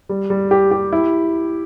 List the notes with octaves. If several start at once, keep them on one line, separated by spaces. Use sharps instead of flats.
G3
G3
G4
G4
E4